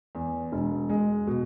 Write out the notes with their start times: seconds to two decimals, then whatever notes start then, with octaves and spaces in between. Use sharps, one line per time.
0.15 E2
0.52 E1
0.89 G#3
1.27 B2